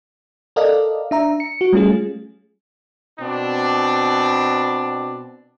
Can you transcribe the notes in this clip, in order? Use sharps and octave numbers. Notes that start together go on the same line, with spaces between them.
A4 A#4 D5 D#5 F5
D4 E5 A#5
C#7
F#4
G3 A3 C#4 F4 G#4
B2 C4 D4